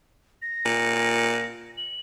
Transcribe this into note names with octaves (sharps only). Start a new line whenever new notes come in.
A#6
A#2
F#7